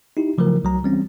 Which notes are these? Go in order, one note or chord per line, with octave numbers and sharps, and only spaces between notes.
D#4 E4 G4
C#3 F3 F#3 A3 A#4
C2 F#3 A#5
E3 G3 C4 C#4